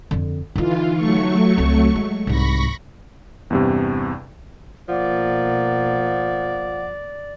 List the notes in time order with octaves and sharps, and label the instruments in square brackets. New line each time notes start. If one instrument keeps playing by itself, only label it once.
[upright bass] F2 D3
[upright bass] D3 D#4 [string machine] E3 F4
[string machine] F#3 A3 C#6
[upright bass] C#2 C4
G#3
[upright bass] C2 G#2 [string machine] B5 C#6 A#6
[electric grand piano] E2 G2 C3
[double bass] B2 A#3 [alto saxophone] F3 [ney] D5 [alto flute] F#5